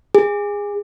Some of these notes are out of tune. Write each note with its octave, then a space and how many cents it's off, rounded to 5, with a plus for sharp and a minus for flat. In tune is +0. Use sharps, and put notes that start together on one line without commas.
G#4 -20